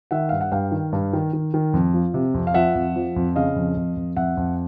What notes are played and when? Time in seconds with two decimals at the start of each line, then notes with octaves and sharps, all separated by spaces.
0.11 D#3 E5 F#5
0.29 G2 F5
0.41 F#5
0.51 G2 F5 G5
0.72 D#3
0.93 G2
1.13 D#3
1.33 D#3
1.54 D#3
1.74 F2
1.93 F3
2.14 C3
2.34 F2
2.47 F5
2.54 F3 E5 F#5
2.75 F2
2.96 F3
3.16 F2
3.36 C#3 D#5 F5
3.56 F2
3.76 F2
3.97 F2
4.16 F2 E5 F#5
4.37 F2